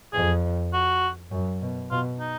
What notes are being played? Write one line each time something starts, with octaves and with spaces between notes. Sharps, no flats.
F2 G#4
F#4
F#2
B2
B2 F4
D#4